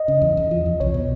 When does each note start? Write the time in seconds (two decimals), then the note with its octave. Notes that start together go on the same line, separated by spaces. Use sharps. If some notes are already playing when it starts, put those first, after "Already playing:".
Already playing: D#5
0.08 C#3
0.22 E2
0.37 E2
0.51 F3
0.66 E2
0.80 C2 C#5
0.94 B2